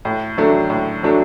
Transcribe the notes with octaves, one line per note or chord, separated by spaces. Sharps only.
A2
F#3 A3 D4
A2
F#3 A3 D4